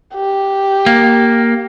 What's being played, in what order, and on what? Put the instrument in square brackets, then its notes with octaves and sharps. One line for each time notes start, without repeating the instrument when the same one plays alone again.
[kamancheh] G4
[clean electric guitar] A#3